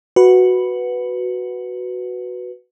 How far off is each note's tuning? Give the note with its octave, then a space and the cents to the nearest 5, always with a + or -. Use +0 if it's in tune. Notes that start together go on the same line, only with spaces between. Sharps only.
F#4 +0 B4 +0